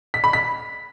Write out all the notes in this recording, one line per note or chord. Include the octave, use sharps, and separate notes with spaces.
B6
B5
B6